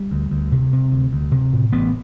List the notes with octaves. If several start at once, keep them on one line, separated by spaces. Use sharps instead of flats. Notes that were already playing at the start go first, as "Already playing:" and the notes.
Already playing: G3
D2
D2
C3
C3
D2
D2
C3
A2
A1 B3